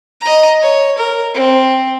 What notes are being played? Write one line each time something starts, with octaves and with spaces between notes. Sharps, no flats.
D#5 A#5
C#5
A#4
C4